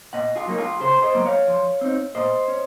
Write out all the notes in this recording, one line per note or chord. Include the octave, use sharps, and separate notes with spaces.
A#2 D#5 F#5
F4 G#4
F#3 A#3 D#4
F4 G#4
C#3 G#4 C5
C5 D#5
F#3 A#3
C#5 F5
F3
C4 D#4
A#2 C5 D#5
C#4